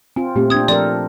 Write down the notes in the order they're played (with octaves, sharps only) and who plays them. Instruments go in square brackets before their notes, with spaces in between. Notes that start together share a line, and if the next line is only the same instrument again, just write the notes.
[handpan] C4 F4 [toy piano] G#5
[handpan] A#2 A3 C4 [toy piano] G4
[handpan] C4 D4 [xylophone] D#6 G#6
[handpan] F3 A4 A#4 [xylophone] D5 [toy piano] C6